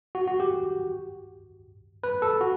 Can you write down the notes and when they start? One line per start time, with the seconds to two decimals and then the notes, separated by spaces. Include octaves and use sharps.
0.15 F#4
0.27 F#4
0.40 G4
2.04 B4
2.22 A4
2.41 F#4